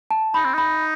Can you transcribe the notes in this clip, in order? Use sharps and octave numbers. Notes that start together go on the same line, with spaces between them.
A5
D#4 B5
C4
D#4 B5